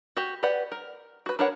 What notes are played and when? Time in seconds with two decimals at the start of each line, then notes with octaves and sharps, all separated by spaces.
0.17 F#4 G4
0.43 G4 B4 D5 F#5
0.72 A#4
1.26 F#4 B4
1.39 D4 A#4 B4 C#5 F#5